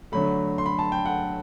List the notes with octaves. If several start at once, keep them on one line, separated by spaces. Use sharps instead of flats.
D3 F#3 A3 B5
C6
B5
A5
G5
F#5